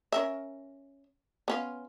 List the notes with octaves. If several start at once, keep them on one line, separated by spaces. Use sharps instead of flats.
C#4 A#4 E5
B3 C#4 F4